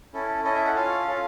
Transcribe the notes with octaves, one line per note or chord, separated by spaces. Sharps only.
C#4 E4 A4
C#4 E4 A4 D#5
E5
F#5
C#4 F4 A4 F5
C#4 F4 A4